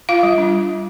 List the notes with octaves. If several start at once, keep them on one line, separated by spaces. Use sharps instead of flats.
F4 F5
G3
D4